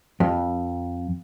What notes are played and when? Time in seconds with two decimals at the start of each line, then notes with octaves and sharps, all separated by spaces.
0.20 F2